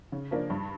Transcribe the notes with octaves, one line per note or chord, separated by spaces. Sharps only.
C#3
F3 A#3 D4
G2